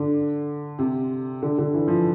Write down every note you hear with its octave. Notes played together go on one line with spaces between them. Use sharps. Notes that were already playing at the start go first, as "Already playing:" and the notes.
Already playing: D3
C3
D3
D3
E3
F3